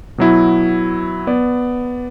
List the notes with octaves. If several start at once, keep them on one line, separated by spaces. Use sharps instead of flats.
B2 F#3 E4
B3 D5